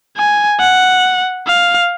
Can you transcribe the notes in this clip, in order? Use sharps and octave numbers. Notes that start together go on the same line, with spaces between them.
G#5
F#5
F5